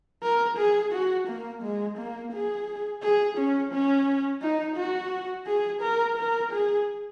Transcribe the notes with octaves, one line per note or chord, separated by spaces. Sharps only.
A#4
G#4
F#4
A#3
G#3
A#3
G#4
G#4
C#4
C#4
D#4
F#4
G#4
A#4
A#4
G#4